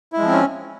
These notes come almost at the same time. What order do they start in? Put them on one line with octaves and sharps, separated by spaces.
E4 G#3 F3 C4 C#4